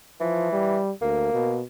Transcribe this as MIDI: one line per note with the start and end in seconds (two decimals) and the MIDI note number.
0.20 0.79 52
0.20 0.48 53
0.52 0.91 55
1.02 1.31 38
1.02 1.58 58
1.33 1.63 47